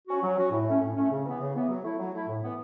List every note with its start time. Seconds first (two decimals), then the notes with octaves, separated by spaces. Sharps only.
0.08 C#4 F#4
0.22 F#3
0.37 C#4 F#4
0.52 A2
0.66 A3 C#4
0.81 A2
0.96 A3 C#4
1.11 C#3
1.25 E3 B3
1.40 C#3
1.55 E3 B3
1.69 F#3
1.84 A3 E4
1.99 F#3
2.14 A3 E4
2.28 A2
2.43 E3 B3